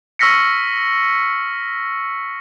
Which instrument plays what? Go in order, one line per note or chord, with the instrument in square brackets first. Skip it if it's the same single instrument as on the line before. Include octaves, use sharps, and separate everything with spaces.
[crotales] C#6 E6 F6 A#6 B6 C#7